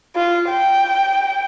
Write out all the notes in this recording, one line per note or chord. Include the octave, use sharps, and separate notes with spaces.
F4
G5